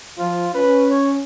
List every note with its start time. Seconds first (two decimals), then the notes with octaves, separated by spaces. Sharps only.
0.19 F3 F4
0.55 C#4 B4
0.90 C#5